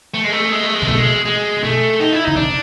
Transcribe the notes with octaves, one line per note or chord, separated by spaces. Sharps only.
A3
G#3
A3
G#3
A3
G#3
C3
B2 A3
G#3
G#3
B2 A3
D#4
E4
C#3 D#4
C3 D4